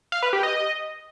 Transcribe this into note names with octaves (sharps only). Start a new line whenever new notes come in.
F5
B4
G4
D#5